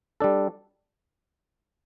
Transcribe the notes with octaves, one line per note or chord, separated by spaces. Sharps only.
G3 D4 A4